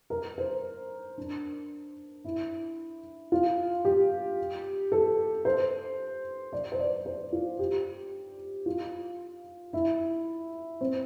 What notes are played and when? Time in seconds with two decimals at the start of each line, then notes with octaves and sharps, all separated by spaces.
0.10 A#4
0.38 C5
1.18 D4
2.25 E4
3.32 F4
3.85 G4
4.92 A4
5.45 C5
6.53 D5
6.72 C5
6.79 D5
7.06 C5
7.32 F4
7.59 G4
8.66 F4
9.73 E4
10.81 C4